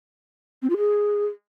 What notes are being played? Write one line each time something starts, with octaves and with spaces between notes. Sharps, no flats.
C4
F4
G#4